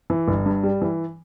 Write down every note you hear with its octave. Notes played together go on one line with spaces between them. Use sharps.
E3
G1
G2
G3
E3